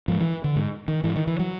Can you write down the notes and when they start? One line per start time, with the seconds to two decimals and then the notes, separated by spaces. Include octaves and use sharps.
0.08 G#2 F3
0.20 E3
0.44 D3
0.56 G#2
0.88 D#3
1.04 G#2 E3
1.16 D#3
1.27 E3
1.39 F#3